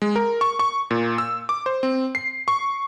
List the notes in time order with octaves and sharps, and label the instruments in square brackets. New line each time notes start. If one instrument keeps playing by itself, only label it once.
[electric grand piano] G#3
A#4
C#6
C#6
A#2
E6
D6
C5
C4
C7
C#6